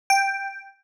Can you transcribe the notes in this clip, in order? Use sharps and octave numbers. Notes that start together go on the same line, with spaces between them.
G5